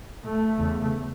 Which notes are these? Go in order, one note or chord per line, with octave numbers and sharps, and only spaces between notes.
A3
E2 C#3